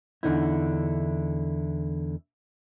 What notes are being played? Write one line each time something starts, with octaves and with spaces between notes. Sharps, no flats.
E2 D3 D#4 E4